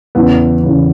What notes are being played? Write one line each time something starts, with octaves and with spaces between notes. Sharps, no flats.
E2 C#3 E3 B3
E2 C#3 E3